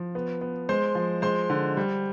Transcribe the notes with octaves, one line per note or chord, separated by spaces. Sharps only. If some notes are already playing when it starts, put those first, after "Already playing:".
Already playing: F3
B3
B3
G#3 C5 C6
F3
G#3 C5 C6
D3
G3